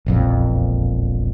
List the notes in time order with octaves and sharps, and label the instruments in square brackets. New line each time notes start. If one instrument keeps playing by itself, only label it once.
[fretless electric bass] E1 A#1 F2